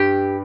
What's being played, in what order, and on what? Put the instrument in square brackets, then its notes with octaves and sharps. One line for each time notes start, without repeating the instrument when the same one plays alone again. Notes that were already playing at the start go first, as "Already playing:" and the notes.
Already playing: [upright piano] G2 [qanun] G4